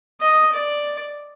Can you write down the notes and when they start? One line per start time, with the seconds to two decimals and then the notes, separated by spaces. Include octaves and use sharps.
0.21 D#5
0.53 D5